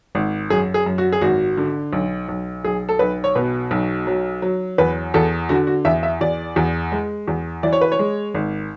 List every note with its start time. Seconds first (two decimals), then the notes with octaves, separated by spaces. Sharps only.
0.15 G#1
0.50 F#2 G#4
0.74 G#4
0.86 F#2
0.98 F#4
1.12 G#4
1.21 G#1 F#4
1.57 D3
1.93 B1
2.29 B1
2.64 B1 G#4
2.89 A4
2.99 B1 B4
3.24 C#5
3.35 B2 B4
3.71 B1
4.07 F#3
4.42 F#3
4.78 E2 B4
5.14 E2 A4
5.49 D3 F#4
5.67 F#4
5.85 E2 E5
6.03 E5
6.21 E2 D5
6.56 E2
6.92 G#3
7.28 E2
7.63 E3 D5
7.73 C#5
7.81 B4
7.92 C#5
7.99 G#3
8.34 G#1